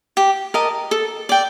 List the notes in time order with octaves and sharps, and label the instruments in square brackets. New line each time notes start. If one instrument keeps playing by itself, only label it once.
[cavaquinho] G4
A#4 D#5 A5
A4
D5 G5